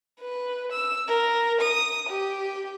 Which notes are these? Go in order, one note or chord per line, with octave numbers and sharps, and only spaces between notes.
B4
E6
A#4
D#6
G4